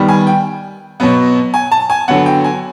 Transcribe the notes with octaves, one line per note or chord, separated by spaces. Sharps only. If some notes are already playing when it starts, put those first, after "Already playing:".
Already playing: D#3 G3 B3
G#5
G5
B2 F#3 B3
G#5
A5
G#5
D3 F#3 B3 F#5
G5
G#5